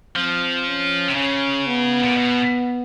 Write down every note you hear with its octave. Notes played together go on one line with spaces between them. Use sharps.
F3 C4
C#4
C3
C#3 C#4
B3
A#2
B2